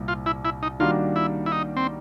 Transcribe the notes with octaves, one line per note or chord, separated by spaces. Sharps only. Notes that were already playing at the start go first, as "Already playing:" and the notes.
Already playing: C2 A#2 G3 C4
F4
E4
E4
D#4
D#3 G3 A#3 D4 F4 F#4
E4
E4
D#4
C4